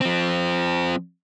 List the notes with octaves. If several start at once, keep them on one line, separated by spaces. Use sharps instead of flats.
F3 C4